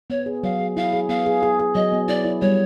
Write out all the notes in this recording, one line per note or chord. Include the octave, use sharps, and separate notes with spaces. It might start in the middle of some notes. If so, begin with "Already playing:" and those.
B3 C#5
G#4
F#3 F5
G#4
E4 F5
G#4
B3 F5
G#4
G#4
G#4
F#3 D#5
B3
E4 D5
E4
G3 C#5